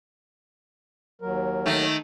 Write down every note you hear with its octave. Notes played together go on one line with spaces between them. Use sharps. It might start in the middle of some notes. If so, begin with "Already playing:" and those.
D#2 F#3 A#4
D#3 A3